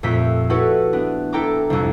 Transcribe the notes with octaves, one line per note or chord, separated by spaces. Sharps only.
F2 A#2 A3 G4 B6
E4 F#4 G4 A4 B4 C#5
B3 D4
E4 A4 G5 A#5 D6
C2 F2